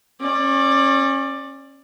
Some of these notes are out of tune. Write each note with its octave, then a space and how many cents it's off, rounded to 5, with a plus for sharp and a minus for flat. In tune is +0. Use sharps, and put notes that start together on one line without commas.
C#4 -25 D5 +15